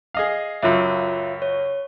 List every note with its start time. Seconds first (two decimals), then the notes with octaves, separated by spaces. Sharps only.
0.14 G#4 D#5 F5
0.63 C#2 F#2 F4 C#5 E5
1.42 C#5